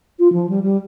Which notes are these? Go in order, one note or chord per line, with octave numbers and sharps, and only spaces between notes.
F4
F3
G3
G3